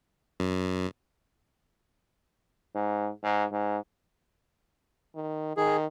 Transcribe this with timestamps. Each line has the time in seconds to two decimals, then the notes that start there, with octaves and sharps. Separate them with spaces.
0.40 F#2
2.75 G#2
3.24 G#2
3.52 G#2
5.15 D#3
5.57 D#3 G#4